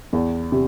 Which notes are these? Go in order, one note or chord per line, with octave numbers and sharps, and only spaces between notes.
E2
C3